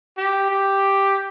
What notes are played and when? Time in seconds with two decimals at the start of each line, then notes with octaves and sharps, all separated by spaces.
0.17 G4
0.51 G4